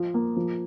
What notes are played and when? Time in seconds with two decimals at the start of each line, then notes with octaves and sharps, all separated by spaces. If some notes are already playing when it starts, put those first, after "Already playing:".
Already playing: F3 F4
0.14 A#3
0.37 F3